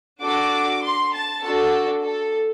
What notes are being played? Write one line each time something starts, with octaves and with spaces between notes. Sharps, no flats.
D4 F#4 A4 D6
C6
A5
D4 F#4 A4
A4